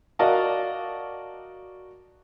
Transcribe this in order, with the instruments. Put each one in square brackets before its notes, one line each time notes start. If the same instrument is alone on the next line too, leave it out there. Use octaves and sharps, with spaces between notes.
[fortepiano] F#4 A#4 D5 D#5 F5 A5